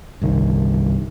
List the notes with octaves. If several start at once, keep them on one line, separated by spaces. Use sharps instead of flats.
G1 C2 D#3